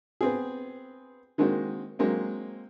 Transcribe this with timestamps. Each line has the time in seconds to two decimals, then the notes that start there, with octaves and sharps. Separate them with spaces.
0.21 B3 C4 G#4
1.38 D#3 G#3 A#3 C4 F#4
1.99 F#3 G#3 A#3 C4